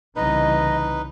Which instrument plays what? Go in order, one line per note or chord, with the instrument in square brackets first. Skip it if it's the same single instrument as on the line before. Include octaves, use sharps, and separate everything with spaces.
[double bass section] C2 C#3 E3 [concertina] D#4 B4 [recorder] D#5